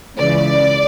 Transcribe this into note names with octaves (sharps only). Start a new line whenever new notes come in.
C#2 C#3 E3 D5